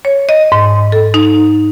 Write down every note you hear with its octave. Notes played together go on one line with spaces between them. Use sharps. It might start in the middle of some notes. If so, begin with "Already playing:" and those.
C#5
D#5
G#2
A4
D#4